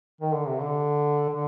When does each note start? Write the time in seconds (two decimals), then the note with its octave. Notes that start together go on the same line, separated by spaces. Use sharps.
0.21 D#3
0.34 D3
0.48 C3
0.61 D3
1.30 D3